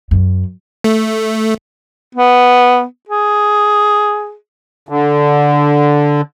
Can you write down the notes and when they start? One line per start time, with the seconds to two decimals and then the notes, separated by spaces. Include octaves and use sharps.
0.11 F#2
0.84 A3
2.15 B3
3.09 G#4
4.89 D3